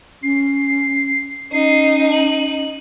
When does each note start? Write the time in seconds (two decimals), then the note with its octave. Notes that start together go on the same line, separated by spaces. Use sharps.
0.23 C#4 C7
1.52 C#4 D#4 C7 D#7
2.11 F#7